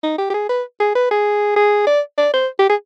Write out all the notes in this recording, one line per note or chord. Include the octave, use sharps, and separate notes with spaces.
D#4
G4
G4
G#4
B4
G#4
B4
G#4
G#4
D5
D5
C5
G4
G#4